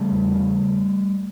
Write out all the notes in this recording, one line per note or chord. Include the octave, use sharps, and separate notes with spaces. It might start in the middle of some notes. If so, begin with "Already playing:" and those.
Already playing: C#3 G3 A3
E2
C#3